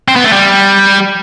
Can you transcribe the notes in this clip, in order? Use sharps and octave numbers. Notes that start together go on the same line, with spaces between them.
C4
B3
A3
G3